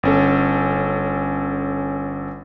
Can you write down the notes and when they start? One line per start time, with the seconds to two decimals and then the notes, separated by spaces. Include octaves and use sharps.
0.03 G1 C#4 A4